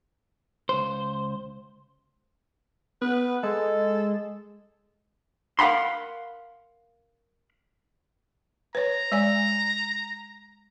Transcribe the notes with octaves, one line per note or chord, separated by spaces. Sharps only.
C#2 C5
B3 B4
G#3 A4
A#4 F5 F#5 B5 C6
B4 C#5 A#5
G#3 D5 G#5